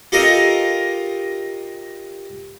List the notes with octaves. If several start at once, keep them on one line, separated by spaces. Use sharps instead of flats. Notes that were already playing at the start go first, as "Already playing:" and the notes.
F4 G4 A4 A#4 D#5 F5